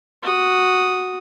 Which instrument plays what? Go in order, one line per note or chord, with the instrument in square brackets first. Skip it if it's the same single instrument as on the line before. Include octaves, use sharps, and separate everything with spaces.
[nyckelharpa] F#4 D#6